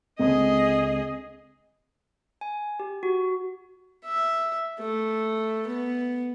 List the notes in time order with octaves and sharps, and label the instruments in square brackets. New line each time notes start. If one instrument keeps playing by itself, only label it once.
[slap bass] C#2 D3 G#3 [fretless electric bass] C4 [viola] G#4 D#5
[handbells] G#5
G4
F#4
[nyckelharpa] E5
A3
B3